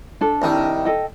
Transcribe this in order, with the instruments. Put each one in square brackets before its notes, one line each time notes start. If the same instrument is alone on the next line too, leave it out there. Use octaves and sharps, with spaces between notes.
[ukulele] D4 A4
[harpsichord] C2 D#3
[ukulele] A4 D#5 G5